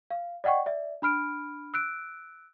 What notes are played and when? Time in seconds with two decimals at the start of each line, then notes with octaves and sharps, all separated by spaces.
0.11 F5
0.44 D5 D#5 F#5 G5 C#6
0.66 D5 E5
1.02 D4 B5 F6 D7
1.74 E6 F#6 D7